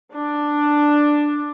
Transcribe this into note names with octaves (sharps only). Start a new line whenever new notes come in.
D4